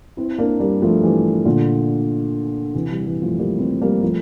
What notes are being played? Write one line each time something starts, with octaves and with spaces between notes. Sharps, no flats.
C4 E4
A#3 D4
G3 A#3
F3 A3
E3 G3
A#2 D3
C3 E3
E3 G3
E3 G3
F3 A3
G3 A#3
A3 C4
G3 A#3
F3 A3